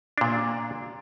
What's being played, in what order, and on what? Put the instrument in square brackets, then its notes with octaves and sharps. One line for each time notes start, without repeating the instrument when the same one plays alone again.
[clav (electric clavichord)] A#2 D4